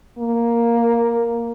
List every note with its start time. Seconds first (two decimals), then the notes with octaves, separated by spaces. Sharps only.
0.18 A#3